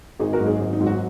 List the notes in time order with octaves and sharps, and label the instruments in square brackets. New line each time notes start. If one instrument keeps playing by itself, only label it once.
[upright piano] G#1 [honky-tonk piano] D#4 G#4
[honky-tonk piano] F#4 A#4
[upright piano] G#2 F#3
[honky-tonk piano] D#4 G#4
[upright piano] G#1
[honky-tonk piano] D#4
[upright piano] G#2 F#3
[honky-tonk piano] F#4